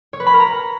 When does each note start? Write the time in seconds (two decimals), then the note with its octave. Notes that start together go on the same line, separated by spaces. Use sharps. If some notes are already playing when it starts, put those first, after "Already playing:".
0.13 C#5
0.20 B4
0.27 B5
0.33 A#4
0.40 A#5